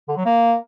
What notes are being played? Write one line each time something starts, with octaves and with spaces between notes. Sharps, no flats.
D3
F#3
A#3